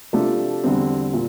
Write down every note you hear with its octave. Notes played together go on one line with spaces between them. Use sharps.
C3 F3 A3 D4 A4
E2 D3 G3 C4
A#2